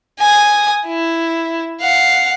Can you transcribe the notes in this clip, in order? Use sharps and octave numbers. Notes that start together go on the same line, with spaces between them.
G#5 D#6
E4
F5 F#5